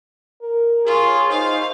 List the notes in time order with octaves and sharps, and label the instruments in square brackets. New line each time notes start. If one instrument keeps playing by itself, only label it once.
[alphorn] A#4
[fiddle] F4 [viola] G#4 C#5
[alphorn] D#4 [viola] C5 [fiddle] F5